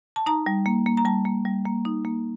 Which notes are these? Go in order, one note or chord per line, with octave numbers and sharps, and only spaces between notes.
A5
D#4 A#5
G3
A#3
A#3
A#5
G3 A5
A#3
G3
A#3
D#4
A#3